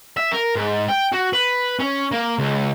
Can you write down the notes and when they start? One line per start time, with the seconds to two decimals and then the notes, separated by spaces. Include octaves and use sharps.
0.17 E5
0.32 A#4
0.56 G#2
0.88 G5
1.12 F#4
1.33 B4
1.79 C#4
2.11 A#3
2.39 C#2